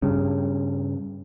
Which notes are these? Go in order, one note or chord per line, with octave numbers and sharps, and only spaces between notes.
G2 C#3